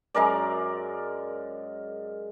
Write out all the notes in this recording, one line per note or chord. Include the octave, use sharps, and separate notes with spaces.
F#2 G#3 A#4 D5